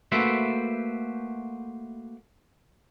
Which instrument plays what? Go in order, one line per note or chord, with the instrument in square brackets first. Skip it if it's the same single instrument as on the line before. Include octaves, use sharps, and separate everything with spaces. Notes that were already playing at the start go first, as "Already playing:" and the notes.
[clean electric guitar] A3 A#3 F#4 B4 C5 E5